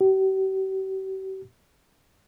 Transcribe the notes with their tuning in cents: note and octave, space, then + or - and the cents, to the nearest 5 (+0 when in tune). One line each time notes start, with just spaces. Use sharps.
G4 -45